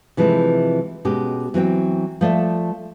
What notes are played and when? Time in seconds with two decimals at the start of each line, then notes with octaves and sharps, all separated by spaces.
0.17 C3 E3 F3 G#3 A3 E4
1.05 B2 G#3 C#4 G4
1.54 E3 F#3 C4 G5
2.21 F3 A3 D5 E5